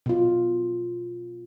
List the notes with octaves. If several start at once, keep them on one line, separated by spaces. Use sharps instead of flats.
B2 F4